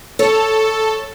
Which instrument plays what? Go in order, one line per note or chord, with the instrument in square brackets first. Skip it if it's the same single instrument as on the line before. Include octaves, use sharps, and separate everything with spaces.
[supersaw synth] A4 [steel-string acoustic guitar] C#5